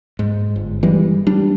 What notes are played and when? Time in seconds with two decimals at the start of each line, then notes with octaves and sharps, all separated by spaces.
0.19 G#2
0.56 G1
0.83 E3 G3 G#3
1.27 G3 D4